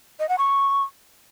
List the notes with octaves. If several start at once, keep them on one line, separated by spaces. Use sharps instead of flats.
D#5
F#5
C#6